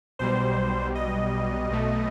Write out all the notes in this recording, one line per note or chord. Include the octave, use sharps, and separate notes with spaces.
B1 B2 G3 C5
D#5
B1 B2 A3